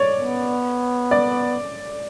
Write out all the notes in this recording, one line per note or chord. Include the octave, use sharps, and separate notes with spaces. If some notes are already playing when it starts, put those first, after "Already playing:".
Already playing: C#5 D5
B3
D5